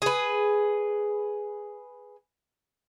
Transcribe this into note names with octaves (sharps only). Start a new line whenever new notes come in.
G#4 B4